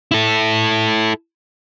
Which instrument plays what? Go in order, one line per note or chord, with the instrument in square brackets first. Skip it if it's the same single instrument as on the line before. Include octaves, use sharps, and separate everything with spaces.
[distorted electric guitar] E4 A4